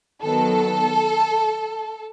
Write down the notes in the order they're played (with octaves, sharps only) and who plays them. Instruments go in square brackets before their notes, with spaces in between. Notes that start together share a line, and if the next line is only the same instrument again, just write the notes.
[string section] D#3 F#3 B3 A4